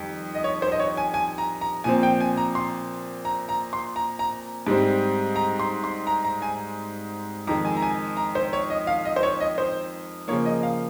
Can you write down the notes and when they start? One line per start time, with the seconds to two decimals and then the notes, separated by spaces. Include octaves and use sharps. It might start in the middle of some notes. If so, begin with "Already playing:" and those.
Already playing: F2 D#3 G3
0.35 D#5
0.44 C#5
0.62 C5
0.72 D#5
0.80 C#5
0.97 G#5
1.14 G#5
1.38 A#5
1.61 A#5
1.84 A#2 F3 C4 G#5
2.03 G5
2.20 G#5
2.37 A#5
2.55 C6
3.25 A#5
3.49 A#5
3.73 C6
3.96 A#5
4.19 A#5
4.67 G#2 G3 C4
5.36 A#5
5.60 C6
5.84 C6
6.07 A#5
6.25 A#5
6.42 G#5
7.47 F2 D#3 G#3 A#5
7.65 G#5
7.77 A#5
7.82 G#5
8.17 A#5
8.35 C5
8.53 C#5
8.70 D#5
8.87 F5
9.05 D#5
9.16 C5
9.23 C#5
9.40 D#5
9.58 C5
10.28 C#3 F3 A#3 C#5
10.46 D#5
10.63 F5